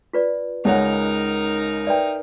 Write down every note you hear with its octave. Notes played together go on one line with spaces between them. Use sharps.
F4 B4 D5
C#2 D#4 A#4 C#5 F#5
B4 D5 E5 G5